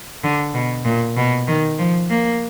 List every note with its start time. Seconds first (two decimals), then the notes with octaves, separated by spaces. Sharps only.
0.23 D3
0.54 B2
0.85 A#2
1.17 B2
1.47 D#3
1.78 F3
2.09 A#3